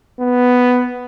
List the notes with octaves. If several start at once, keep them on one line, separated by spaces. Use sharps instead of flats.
B3